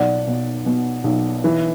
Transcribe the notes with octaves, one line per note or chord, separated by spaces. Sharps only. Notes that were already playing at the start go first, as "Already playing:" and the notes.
Already playing: B1 D5 F#5
B2
B2
B1
E3